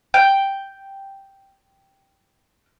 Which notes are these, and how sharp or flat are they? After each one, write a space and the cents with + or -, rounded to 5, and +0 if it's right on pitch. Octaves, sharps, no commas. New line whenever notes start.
G5 +0